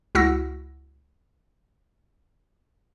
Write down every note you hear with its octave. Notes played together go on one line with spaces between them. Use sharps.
C#2 E4 F#4 F#5 E6 A#6